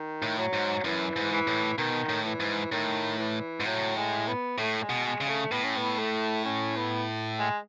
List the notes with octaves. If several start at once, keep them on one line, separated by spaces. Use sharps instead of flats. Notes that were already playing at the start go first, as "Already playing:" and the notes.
Already playing: D#3
A2
F#3
G#2
F#2 E3
G#2
E3
A2
B2 D#3
A2
E3
G#2
A2 D#3
E3
G#2
A2 F#3
G#3
B3
A2 A3
G#3
B2
G#3
C#3
A3
A2 B3
C#4
B3
A3
C#4
B3
G#3